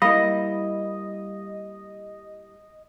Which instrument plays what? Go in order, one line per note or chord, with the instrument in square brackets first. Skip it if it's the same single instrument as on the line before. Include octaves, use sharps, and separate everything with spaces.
[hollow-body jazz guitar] G3 A#3 E4 [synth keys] D#5 [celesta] F5 B5 A#6